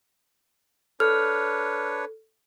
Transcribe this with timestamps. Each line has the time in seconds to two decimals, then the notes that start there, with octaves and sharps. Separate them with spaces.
1.00 D4 A4 B4 C#5 F6